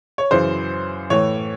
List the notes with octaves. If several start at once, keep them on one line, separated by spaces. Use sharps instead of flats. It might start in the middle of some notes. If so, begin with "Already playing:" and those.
C#5
F#2 C#3 E3 C5
A2 E3 C#5